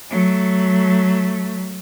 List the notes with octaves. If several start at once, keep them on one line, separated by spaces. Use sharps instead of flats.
F#3 A3